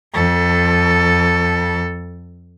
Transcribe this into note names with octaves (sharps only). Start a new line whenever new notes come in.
F2 A4